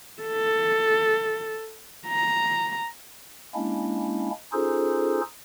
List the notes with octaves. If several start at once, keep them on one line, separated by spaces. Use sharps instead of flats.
A4
A#5
G#3 A#3 C#4 D4 E4
C#4 D#4 F4 G#4 A4 C5